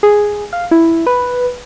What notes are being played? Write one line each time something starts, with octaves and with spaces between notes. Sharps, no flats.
G#4
F5
E4
B4